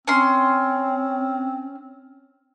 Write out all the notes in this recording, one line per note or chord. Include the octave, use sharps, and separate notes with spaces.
C4 C#4 C6